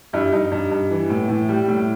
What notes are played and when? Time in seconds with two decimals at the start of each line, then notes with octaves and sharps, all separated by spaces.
0.13 G2 E4
0.32 G2 D#4
0.52 G2
0.71 G2
0.90 E3
1.10 A2
1.29 A2
1.49 G3
1.68 A2